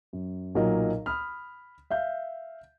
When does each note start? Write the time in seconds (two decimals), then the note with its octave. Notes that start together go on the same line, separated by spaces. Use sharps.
0.13 F#2
0.55 B1 A#2 F#3 A#4 D#5
1.06 B5 D#6 F6
1.90 E5 F5 G6